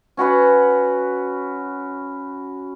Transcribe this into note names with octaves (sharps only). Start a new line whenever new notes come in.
C#4 F#4 B4 F#5